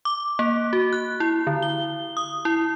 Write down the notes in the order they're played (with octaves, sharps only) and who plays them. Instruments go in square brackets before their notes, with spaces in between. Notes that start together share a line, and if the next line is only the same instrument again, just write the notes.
[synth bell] D6
A#3
F#4
F#6
E4
D3
G7
D#6
E4